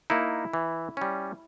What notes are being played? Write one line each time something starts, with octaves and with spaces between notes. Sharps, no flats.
A#3 D#4 E4
E3
G3 C#4